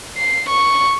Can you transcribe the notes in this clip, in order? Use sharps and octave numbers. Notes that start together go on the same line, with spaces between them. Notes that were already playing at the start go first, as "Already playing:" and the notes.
C7
C#6